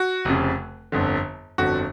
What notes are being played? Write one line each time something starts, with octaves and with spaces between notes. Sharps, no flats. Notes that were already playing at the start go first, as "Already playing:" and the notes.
Already playing: F#4
F1 F2 C#3
G1 F2 D3
G1 F2 D3 F#4